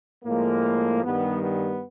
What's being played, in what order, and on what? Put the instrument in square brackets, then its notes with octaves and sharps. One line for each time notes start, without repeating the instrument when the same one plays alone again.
[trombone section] A2 F3 G#3 A#3
G2 D#3 G3 B3
B3